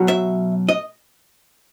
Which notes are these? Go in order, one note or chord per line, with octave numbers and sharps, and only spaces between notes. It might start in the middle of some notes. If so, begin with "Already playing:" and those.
Already playing: B2 F#3 C#4
E5
D#5